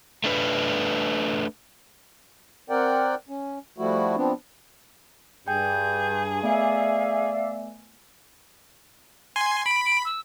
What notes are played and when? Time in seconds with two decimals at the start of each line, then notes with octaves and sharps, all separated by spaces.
0.24 A3 D4 B4
2.70 C4 A#4 D5 F#5 G5
3.29 C#4
3.78 F3 G3 A3 E4 F#4
4.16 F3 B3 C4 D4
5.48 G2 G#4 G5 G6
6.44 A3 B3 D5 E5 F5 G#5
9.36 G#5 C6
9.66 B5 D7
9.86 D7
10.05 E6